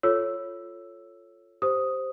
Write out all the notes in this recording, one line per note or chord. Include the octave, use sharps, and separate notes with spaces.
F4 A4 C#5 E6
G4 C5 D#6